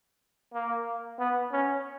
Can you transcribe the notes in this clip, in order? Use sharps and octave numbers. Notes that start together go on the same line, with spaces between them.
A#3
B3
C#4